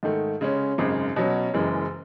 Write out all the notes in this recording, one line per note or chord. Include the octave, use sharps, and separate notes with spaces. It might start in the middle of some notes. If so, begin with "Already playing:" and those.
G#2 D#3 A3
C#3 G#3 C#4
G#1 F#2 C#3 G#3
B2 F#3 C#4
F#1 F#2 E3 G#3